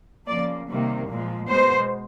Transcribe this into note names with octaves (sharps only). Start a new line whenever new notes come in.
C#3 F3 A#3 D5
C3 D#3 G3 A#3
A#2 F3 G#3
B2 G#3 B3 C5